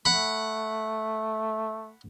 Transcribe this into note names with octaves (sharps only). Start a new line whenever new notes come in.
A3 F#5 B5